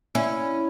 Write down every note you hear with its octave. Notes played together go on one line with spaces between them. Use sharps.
C#4 E4